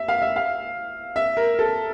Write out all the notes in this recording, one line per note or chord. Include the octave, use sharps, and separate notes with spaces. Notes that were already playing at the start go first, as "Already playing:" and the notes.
Already playing: E5
F5
E5
F5
E5
A#4
A4